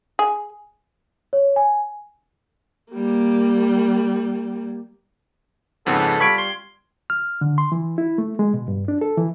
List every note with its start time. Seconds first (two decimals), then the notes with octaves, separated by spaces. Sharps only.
0.19 G#4
1.33 C#5
1.56 G#5
2.93 G3 A#3
5.86 F2 G#2 C#3 B3 C4 A4
6.20 G3 F4 B5 C#6 G#6 D7
6.38 C6
7.10 F6
7.41 D3
7.58 C6
7.72 E3
7.98 E4
8.18 A3
8.39 G#3
8.54 B2
8.68 G2
8.88 D4
9.01 A4
9.17 E3